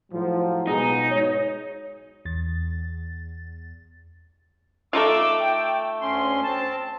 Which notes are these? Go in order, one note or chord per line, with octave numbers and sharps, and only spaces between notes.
A2 F3 F#3
B2 G#3 D#4 G#4
G#2 C#5
E2 A6
A3 D#4 F4 D6 E6
G5
D2 C#4 C6
C4 A5